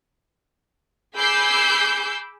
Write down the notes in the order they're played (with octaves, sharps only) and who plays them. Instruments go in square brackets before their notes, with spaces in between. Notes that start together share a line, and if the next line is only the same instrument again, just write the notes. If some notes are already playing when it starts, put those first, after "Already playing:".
[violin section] G#4 B5 D6 E6 G6 C7